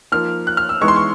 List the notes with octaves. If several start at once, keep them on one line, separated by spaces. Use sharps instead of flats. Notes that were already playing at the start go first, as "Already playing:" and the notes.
F3 A#3 D#4 F6
F#6
F6
E6
E3 G#3 B3 D#4 C#6
C6
C#6